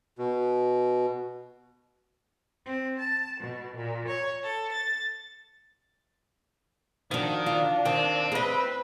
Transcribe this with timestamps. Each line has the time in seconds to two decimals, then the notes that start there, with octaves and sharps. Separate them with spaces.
0.18 B2
2.66 C4
2.99 A5
3.39 B2
3.75 A#2
4.08 C#5
4.42 A4
4.73 A6
7.11 D#3 F3 D4 F#4
7.46 D4 F4
7.85 D#3 C4
8.32 G#4 B4 D#5